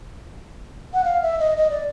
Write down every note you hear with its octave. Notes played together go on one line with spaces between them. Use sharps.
F#5
F5
E5
D#5
D#5
D5